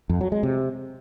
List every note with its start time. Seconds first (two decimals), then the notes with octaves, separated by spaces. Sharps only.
0.09 F2
0.21 F#3
0.32 G#3
0.43 C3